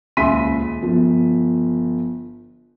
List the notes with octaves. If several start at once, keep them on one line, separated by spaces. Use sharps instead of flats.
D#1 C#2 E5 C6 B6 D#7
G1 F3